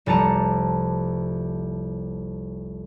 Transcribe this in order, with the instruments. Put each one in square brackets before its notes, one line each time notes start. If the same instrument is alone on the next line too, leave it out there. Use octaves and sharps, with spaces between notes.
[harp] F1 C2 A5 A#5 C#7 D#7